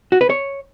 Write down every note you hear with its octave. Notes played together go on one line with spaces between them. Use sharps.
F#4
B4
C#5